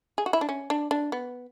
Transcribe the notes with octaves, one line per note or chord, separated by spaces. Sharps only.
G#4
F#4
E4
D4
C#4
D4
D4
B3